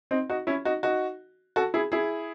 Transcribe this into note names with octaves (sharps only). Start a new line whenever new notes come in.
C4 D#4
D#4 F#4
C#4 E4
D#4 F#4
D#4 F#4
F#4 A4
E4 G#4
E4 G#4